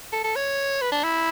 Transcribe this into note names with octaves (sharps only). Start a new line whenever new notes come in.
A4
A4
C#5
B4
D4
E4